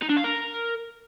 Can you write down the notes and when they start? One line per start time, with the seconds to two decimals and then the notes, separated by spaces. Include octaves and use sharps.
0.02 D#4
0.10 D4
0.17 F5
0.24 A#4